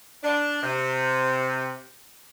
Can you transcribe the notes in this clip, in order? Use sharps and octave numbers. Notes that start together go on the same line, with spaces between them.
D4
C3